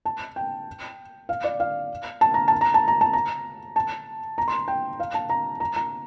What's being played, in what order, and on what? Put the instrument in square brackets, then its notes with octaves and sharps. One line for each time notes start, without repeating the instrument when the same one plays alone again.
[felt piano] A5
G5
F5
D5
F5
A5
A#5
A5
A#5
A5
A#5
A5
A#5
A5
A#5
C6
G5
F5
A5
A#5
A#5
A#5